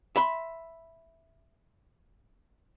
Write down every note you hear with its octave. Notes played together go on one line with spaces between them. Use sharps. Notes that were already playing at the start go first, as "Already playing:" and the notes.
E5 B5 C6